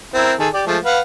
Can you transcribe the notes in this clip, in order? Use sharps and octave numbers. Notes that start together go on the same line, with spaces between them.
C4 E4 A#4
D#3 G#4 A4
G4 D5
F3 G#3 A3
B4 F5 F#5